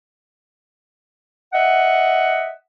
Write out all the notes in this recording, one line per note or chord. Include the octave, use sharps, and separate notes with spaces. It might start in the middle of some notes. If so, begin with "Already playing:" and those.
D#5 E5 F#5